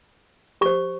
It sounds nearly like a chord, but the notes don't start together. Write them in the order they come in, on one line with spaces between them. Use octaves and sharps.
G4 C#6 C5